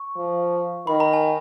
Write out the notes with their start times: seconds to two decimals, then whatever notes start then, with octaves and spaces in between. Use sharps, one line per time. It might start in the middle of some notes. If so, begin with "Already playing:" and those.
Already playing: C#6
0.16 F3
0.87 D#3 B5
1.00 A#5
1.13 G#5